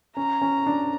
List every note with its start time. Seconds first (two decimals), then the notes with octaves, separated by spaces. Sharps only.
0.17 C#4 A#5
0.41 C#4
0.67 D4